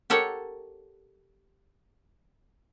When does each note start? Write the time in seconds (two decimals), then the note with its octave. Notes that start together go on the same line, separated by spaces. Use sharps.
0.10 G4 A4 A#4 C#5 F#5